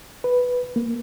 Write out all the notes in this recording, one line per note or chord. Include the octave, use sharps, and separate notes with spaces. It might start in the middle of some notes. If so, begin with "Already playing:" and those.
B4
A#3